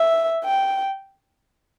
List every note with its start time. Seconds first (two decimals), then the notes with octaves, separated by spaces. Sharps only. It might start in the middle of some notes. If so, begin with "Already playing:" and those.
Already playing: E5
0.44 G5